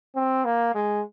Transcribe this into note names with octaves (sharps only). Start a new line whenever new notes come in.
C4
A#3
G#3